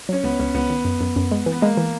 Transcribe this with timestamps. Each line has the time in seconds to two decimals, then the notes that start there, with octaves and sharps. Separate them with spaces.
0.09 F#3 C#4
0.24 C#2 B3
0.39 C#2 C#4
0.54 C#2 B3
0.70 D#3
0.85 F#2
1.01 F#2
1.16 F#2
1.32 G#3
1.46 E3
1.52 B3
1.61 G#3 A#3
1.77 E3